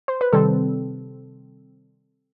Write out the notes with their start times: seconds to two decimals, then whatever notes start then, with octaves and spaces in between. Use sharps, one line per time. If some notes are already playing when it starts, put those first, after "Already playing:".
0.08 C5
0.21 B4
0.33 C3 D#3 G3 C4 A4